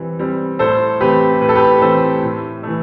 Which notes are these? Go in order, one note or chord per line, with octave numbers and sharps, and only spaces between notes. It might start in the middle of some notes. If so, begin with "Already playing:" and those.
Already playing: E3 G3 C4
G3 C4
A2 A4 C5
E3 A3 C4 G4 B4
A2 B4
A4
G4 B4
E3 A3 C4 A4 C5
A2
E3 A3